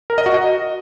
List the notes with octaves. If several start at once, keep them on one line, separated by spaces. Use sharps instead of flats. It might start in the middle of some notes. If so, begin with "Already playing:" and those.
A#4
D#5
F#4
D#5